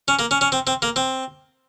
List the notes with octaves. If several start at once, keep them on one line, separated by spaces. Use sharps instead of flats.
C#4
A#3
C#4
C#4
C4
C4
A#3
C4